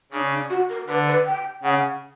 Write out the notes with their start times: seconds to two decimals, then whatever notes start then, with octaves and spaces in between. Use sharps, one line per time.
0.12 C#3 D4
0.31 D4
0.49 F#4
0.69 A#4
0.87 D3 B4
1.06 B4
1.26 G5
1.63 C#3 F#5